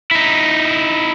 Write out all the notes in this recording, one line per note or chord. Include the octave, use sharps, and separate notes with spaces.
D#4 E4